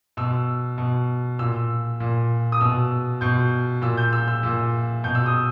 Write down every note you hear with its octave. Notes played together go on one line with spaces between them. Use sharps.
B2 E6
B2
A#2 E6
A#2
D#6
B2 E6
B2 G6
A#2 E6
G6
E6
E6
A#2
B2 G6
E6
D#6